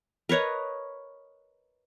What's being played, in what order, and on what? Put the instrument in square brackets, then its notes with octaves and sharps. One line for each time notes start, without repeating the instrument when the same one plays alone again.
[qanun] A#4 B4 C#5 D#5